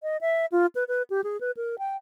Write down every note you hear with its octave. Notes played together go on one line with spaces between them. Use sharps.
D#5
E5
F4
B4
B4
G4
G#4
B4
A#4
G5